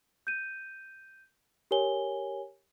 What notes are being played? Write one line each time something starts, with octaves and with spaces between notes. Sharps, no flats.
G6 D#7
G4 A#4 C#5 G#5 G7